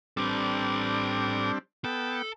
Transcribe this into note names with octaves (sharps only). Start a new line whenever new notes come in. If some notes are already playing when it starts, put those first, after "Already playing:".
G3 C4 D4 A4 B4
B3 A4 G5